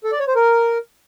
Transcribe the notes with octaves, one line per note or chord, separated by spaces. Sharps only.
A4
D5
C#5
C5
A#4